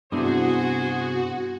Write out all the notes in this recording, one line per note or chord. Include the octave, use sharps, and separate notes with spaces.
G2 C3 B3 D4 E4 F#4 G#4 C5